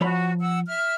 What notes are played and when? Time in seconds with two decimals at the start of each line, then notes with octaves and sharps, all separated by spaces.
0.01 F3 F#4 C#5 B5
0.41 F#5 E6
0.68 E5 F6